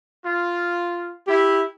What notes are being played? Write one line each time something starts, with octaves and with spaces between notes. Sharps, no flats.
F4
E4 G4